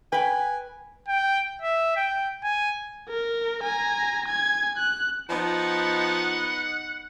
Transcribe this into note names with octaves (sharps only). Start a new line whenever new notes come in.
B4 G5 G#5
G5
E5
G5
G#5
A#4
G#5 A#5
G#5 G#6
F#6
F3 B3 D#4 F#5